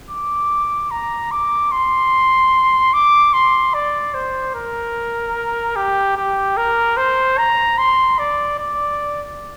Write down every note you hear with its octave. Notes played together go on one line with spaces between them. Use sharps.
D6
A#5
D6
C6
D6
C6
D5
C5
A#4
G4
G4
A#4
C5
A#5
C6
D5
D5